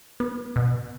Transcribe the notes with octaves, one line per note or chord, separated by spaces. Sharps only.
B3
B2